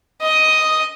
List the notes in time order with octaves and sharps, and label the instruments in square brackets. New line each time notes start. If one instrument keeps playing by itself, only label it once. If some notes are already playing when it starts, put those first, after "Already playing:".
[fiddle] D#5 D#6